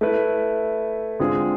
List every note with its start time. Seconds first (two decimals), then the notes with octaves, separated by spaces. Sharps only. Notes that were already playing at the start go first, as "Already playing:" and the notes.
0.01 A3 E4 B4
1.20 D3 G#3 C4 F4 G#4